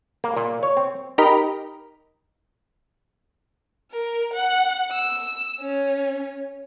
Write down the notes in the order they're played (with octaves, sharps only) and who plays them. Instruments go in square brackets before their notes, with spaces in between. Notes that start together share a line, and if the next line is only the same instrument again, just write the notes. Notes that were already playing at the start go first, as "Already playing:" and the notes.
[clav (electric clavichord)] A#3
A#2
C#5
C4
[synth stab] D#4 G4 A#4 D#5 B5
[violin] A#4
F#5
E6
C#4